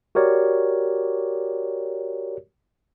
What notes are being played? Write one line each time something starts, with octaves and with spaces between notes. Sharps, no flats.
F#4 G4 A#4 C#5 D5